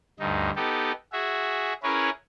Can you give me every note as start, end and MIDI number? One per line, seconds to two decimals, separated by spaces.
0.19 0.50 38
0.19 0.50 43
0.19 0.50 63
0.56 0.92 59
0.56 0.92 63
0.56 0.92 67
0.56 0.92 69
1.12 1.73 66
1.12 1.73 68
1.12 1.73 76
1.83 2.10 61
1.83 2.10 64
1.83 2.10 68
1.83 2.10 70
1.83 2.10 71
1.83 2.10 73